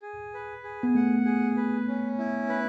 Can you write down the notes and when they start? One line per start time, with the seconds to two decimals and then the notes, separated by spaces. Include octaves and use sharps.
0.02 G#4
0.34 B4
0.64 G#4
0.83 B3
0.95 A3 F#5
1.25 G#4
1.57 B4
1.88 C#4
2.19 E4
2.49 B4